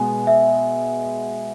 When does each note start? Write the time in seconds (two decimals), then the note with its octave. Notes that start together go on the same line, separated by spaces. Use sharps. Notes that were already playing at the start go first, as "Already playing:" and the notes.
Already playing: B2 G#3 B3 G#4 G#5
0.27 E5